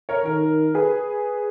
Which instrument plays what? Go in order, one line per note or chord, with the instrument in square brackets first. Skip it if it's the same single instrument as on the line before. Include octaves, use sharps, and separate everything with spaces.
[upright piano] A#4 C#5
[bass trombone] D#3 [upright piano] A#4
[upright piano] G#4 B4